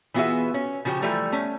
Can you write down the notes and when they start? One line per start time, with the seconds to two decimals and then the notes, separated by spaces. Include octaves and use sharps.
0.14 E3 B3 F4 F#4 G#4 E5
0.54 C#4
0.85 C#3 F3 F#4 G4
1.02 E3 F3 G3 A3 A#5
1.32 A3 C#4